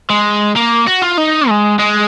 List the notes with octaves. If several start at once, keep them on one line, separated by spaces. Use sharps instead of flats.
G#3
A#3
F#4
F4
D#4
G#3
G#3